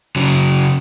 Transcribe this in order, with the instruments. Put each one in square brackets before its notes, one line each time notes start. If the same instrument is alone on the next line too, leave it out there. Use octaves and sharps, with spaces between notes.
[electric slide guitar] C#3 F#3